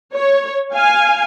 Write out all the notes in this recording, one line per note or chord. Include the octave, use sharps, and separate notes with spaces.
C#5
F5 G#5